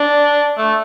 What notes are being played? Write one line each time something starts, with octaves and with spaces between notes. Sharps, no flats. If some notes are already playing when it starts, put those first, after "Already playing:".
Already playing: D4
A3